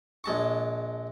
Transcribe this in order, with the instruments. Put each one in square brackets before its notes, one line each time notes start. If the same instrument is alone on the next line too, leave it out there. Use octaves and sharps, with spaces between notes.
[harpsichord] A#1 G#3 A5 C#6